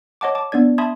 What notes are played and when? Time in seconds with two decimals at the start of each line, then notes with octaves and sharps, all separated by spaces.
0.21 C#5 D#5 F#5 A5 D6
0.35 A5 D6
0.52 B3 D4 D5 G#6
0.78 E5 A5 B5 C6 D#6 G#6